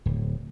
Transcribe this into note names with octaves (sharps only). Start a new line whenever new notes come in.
D1